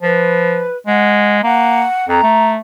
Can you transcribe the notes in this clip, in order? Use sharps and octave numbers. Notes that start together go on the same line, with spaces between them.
F3 B4
G#3 F#5
A#3 F#5
F2 A#5
A3